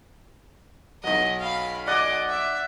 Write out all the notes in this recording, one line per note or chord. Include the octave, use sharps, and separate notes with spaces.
B1 F#3 D#5
F5 B5
D5 D#5 F#5 G#5 D6
E5